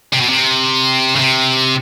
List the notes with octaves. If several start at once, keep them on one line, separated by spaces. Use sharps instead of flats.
C3
B2
C3
C#3
C3